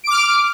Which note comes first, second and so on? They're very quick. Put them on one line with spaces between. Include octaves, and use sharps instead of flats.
D7 D6 F6